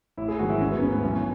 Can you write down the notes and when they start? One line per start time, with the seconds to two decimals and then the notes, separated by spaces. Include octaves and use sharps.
0.17 A1 E4
0.28 G#4
0.39 G#2 D#3 F#3 F#4
0.49 E4
0.60 A1 C#4
0.71 B3
0.82 G#2 E3 C#4
0.92 B3
1.03 B1 C#4